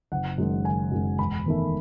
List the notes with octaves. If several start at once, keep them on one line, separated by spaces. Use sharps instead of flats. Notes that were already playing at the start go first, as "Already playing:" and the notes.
F#1 F#5
F#2 D#3 G#3
F#1 G#5
F#2 D#3 G#3
E1 B5
E2 D#3 A3